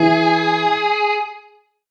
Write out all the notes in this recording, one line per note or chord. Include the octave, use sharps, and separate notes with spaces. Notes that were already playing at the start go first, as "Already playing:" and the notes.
Already playing: E3 G#4